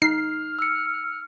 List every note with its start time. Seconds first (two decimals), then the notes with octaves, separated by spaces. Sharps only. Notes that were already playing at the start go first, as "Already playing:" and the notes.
0.02 D#4 F6 C7
0.59 E6 C#7